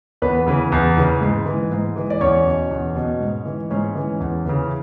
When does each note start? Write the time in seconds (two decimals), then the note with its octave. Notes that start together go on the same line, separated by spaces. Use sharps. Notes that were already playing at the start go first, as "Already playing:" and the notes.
0.22 E2 B3 B4
0.46 C#3 E3
0.72 E2
0.97 C#3 E3
1.21 G#2
1.46 E3
1.72 G#2
1.96 E3
2.10 D5
2.21 E2 C#4 C#5
2.46 B2
2.71 E2
2.96 B2
3.20 G#2
3.45 E3
3.70 G#2 C#4 C#5
3.95 E3
4.20 E2
4.45 C#3 E3